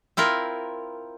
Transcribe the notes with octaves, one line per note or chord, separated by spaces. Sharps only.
C4 E4 F4 A#4